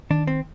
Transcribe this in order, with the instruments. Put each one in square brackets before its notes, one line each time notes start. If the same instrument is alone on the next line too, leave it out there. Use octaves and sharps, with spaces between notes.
[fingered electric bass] D#3 [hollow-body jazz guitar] D4
[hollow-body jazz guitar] C4